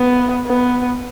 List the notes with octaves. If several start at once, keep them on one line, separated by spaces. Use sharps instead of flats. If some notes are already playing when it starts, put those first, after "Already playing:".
Already playing: B3
B3